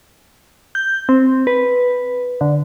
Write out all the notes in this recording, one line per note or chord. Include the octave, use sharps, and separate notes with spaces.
G6
C4
B4
D3